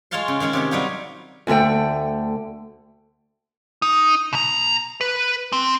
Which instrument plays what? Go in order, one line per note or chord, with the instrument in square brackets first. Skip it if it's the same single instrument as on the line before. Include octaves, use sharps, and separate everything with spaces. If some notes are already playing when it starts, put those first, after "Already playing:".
[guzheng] G#3 F4 C#5 F5 A5 C6
C#3
D#3 G#3 C#4 C#5
C3 G4 C#5
F#3 G3 D#4 F4
[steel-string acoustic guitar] D2 D3 D#3 A3 G5
[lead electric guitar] D#4
B2 A#5
B4
C4